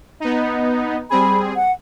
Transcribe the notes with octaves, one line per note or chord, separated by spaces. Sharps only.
B3 D#4
G3 C4 G#4 B5
F#5